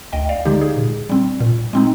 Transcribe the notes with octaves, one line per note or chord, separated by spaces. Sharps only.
D2 D#5 G5
D5 F5
D3 G#3 D#4 G4
G#4
A#2
G3 C4
A#2
G#3 C4 D#4